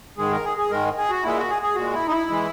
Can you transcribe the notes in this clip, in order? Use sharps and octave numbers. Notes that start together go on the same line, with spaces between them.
G#2 D#3 G#3 G#4
A#4
G#4
G#4
G#2 D#3 G#3 A#4
G#4
F#4
A#2 G#3 E4
F#4
G#4
G#4
A#2 G#3 F#4
E4
D#4
E4
E3 G#3